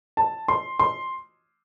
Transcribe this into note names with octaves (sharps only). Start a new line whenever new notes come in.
A5
C6
C6